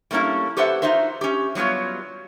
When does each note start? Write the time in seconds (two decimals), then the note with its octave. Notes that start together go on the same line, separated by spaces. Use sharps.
0.11 G3 A3 A#3 C#4 E4
0.57 G4 A4 B4 C5 E5 F#5
0.82 D#4 F4 F#4 C5 E5
1.21 C#4 G4
1.55 F#3 G3 B3 F4 C#5